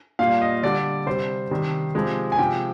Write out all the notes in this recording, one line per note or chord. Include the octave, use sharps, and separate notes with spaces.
A#2 G3 F5
D#5
D3 G3 D5
C3 G3 C5
C3 D#3 G3
C3 F3 G#3
G#5
C3 F3 G#3 G5